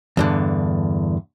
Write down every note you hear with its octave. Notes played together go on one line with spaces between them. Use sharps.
E2 G2 D3